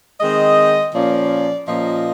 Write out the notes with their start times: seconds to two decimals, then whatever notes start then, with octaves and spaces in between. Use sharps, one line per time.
0.21 D#3 G#3 C4 D#5
0.94 A#2 F3 A#3 C#4 D5
1.68 A#2 F3 A#3 C#4 D#5